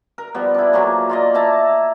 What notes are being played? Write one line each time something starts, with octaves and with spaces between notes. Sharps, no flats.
A#4
F3 G3 B3
D4 E4
F3 F#3 A#3 G#4
F4 D5 D#5
E4 E5 A5 A#5